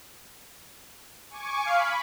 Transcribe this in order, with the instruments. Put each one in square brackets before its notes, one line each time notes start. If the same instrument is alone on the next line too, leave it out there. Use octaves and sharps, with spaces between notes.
[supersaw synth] G#5 C#6 D6
[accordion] F5 [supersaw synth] B5